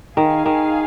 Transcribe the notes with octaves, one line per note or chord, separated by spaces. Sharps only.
D#3 G#4 F5 G#5
D#3